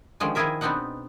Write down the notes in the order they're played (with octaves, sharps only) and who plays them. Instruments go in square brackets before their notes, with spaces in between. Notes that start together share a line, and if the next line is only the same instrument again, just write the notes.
[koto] D3 D#3 F3 G#3 C#4
D#3 F3 E4 G#4 A#4 E5
B2 B3 C4 D4 D#4 F#5